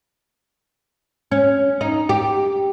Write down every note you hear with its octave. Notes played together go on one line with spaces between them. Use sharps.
C#4
D#4
G4